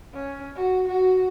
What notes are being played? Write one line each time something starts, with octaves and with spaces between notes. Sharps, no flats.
C#4
F#4
F#4